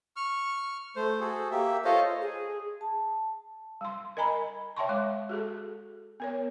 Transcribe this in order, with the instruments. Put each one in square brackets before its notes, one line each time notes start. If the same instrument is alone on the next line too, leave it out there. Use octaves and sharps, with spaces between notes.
[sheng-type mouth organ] C#6 F6
A3 C5
F#4 G#4 A4
A#3 G4 E5
F4 A4 C5 C#5 D#5 F5
[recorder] G#4
[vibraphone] A5
[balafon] G3 C6
A#4 D#5 G#5 A#5 B5
C#5 E5 G5 A5 C6 C#6
G#3 D6
F#4 G#4 A4
B3 A#4 C#5